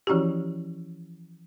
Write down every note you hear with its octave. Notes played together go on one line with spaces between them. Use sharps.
E3 F3 C#4 E4 F#4 G4